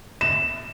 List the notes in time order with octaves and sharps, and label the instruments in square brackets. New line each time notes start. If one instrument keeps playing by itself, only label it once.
[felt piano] E7